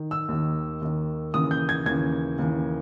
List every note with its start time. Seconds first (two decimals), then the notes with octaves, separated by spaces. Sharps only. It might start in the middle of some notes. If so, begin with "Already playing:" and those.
Already playing: D#3
0.11 E6
0.28 D#2 D#3
0.81 D#2 D#3
1.34 D#2 C#3 E3 D#6
1.51 G6
1.69 G#6
1.86 D#2 C#3 E3 G#6
2.38 D#2 C#3 E3